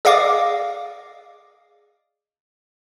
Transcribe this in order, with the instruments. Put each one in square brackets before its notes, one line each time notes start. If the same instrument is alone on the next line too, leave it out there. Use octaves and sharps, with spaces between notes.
[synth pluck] G#4 D5 D#5 F5 D6 D#6